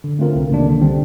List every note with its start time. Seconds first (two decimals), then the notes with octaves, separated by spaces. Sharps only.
0.04 D3
0.19 A3 C4 F4 A#4
0.35 C2
0.50 C3 D#3 A#3 D4
0.66 D3
0.81 G3 C4